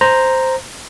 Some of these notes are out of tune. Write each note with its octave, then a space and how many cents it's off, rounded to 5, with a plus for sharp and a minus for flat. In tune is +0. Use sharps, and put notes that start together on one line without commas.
C5 +0 A#5 +0